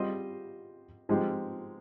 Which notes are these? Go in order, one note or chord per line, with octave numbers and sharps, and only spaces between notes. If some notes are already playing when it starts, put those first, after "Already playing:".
Already playing: G3 C4 F4 C5 D#5
F3 G#3 C4 D#4 G4